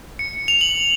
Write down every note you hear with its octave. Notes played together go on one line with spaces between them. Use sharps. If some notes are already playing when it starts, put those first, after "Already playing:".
C#7
F7
F#7